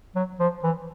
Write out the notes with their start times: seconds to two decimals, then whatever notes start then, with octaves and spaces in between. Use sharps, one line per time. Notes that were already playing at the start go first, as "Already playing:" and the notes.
0.16 F#3
0.40 F3
0.64 E3